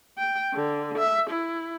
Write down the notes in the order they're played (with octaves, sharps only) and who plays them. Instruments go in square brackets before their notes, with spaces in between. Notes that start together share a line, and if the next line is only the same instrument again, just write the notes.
[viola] G5
D3
E5
E4